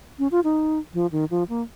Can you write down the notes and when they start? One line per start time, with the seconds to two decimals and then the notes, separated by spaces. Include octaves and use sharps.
0.19 C#4
0.32 F4
0.44 D#4
0.94 F3
1.12 D#3
1.31 F3
1.49 A#3